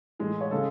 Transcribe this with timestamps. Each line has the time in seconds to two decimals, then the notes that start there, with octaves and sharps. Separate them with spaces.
0.20 A2 E3 G#3
0.41 C#5
0.51 C#3 G#3 A4